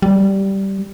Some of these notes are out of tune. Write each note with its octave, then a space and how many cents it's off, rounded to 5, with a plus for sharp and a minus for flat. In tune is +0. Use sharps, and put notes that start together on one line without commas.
G3 -10